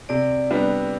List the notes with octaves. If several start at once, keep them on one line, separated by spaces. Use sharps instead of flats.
C3 D5
G3 B3 D4